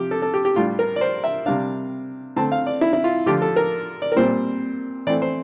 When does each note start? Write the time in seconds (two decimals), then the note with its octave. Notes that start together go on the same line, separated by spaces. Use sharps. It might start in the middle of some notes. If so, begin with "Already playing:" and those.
Already playing: C3 F3 G4
0.11 A4
0.22 A4
0.34 G4
0.45 G4
0.56 A2 G3 D4 F4
0.79 A#4
0.96 D5
1.01 C5
1.24 E5
1.46 C3 G3 D4 F5
2.36 D3 A3 C4 A5
2.52 F5
2.67 D5
2.81 E4
2.93 E4
3.04 F4
3.26 D3 F3 A3 D4 G4
3.42 A4
3.56 A#4
4.02 D5
4.12 A#4
4.16 A#2 G3 C4 C5
5.07 E3 A3 C4 D5
5.22 C5